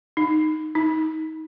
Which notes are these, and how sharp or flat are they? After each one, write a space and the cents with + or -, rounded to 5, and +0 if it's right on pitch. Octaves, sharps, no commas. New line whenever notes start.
D#4 -5
D#4 +25